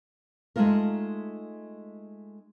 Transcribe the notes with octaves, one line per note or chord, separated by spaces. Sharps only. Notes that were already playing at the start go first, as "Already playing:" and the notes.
G#3 A3 D#4 F4 A#4